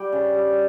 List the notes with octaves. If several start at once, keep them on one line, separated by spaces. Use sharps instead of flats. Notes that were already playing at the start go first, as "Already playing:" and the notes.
Already playing: G3 G5
C#3
G3